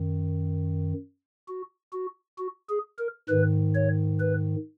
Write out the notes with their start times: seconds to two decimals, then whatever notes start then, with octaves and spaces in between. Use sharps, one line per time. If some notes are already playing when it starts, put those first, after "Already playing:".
Already playing: F#2 D#3
1.48 F#4
1.93 F#4
2.38 F#4
2.69 G#4
2.99 A#4
3.29 G#2 D#3 B4
3.75 C#5
4.20 B4